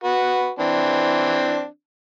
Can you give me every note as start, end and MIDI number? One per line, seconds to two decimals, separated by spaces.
0.04 0.51 66
0.04 0.51 71
0.59 1.66 52
0.59 1.66 60
0.59 1.66 62